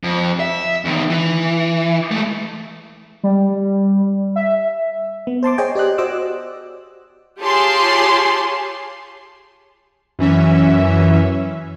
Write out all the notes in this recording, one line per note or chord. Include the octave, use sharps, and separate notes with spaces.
F2
E5
E2 D#3
E3
G#3 A3
G3
E5
B3
C5 A5 C6 D6
G#4 C5 C#5 D#5 G5 G#5
G4 D5 D#5 F#6
F#4 C5 D5 D#5 D6 E6
F4 G4 G#4 C#5 A5 C6
F#2 E3 C#4 E5